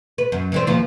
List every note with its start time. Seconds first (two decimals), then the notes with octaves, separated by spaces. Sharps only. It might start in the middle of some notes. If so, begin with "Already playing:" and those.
0.18 B4
0.32 F#2
0.52 E3 G3 C4
0.67 D#2 F3 B3